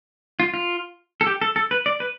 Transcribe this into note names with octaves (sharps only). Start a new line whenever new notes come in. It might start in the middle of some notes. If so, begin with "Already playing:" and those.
F4
F4
A4
G4
A4
A4
B4
D5
B4